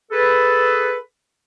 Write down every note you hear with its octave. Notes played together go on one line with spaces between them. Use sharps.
G#4 A4 B4